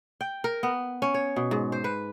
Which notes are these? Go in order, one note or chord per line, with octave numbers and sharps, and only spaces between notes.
G5
A#4
B3
C#4
C#5
B2
G#2
C5
B4